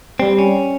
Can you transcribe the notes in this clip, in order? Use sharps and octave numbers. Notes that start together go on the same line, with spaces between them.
G3 C4
C#4